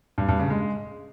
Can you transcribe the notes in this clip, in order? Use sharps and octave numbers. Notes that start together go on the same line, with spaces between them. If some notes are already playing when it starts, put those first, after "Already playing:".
G2
G2
C#3
G#3